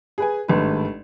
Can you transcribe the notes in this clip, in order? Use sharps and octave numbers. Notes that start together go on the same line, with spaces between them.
G#4 B4 G#5
G#1 G2 A3 B4